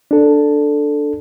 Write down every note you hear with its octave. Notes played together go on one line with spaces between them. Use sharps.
D4 A4